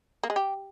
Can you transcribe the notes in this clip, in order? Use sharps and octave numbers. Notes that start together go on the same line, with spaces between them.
A#3
G#3
G4